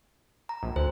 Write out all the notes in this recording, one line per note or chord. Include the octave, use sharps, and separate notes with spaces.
A#5
A#1
D2 C5